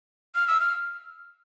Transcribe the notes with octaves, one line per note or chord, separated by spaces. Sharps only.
F6
E6
F6